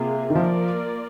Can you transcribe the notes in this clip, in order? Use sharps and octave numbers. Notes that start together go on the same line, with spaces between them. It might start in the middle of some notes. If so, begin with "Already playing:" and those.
Already playing: C3 A#3 F4 G#4
D#3
F3 A#3 F4 A#4 D5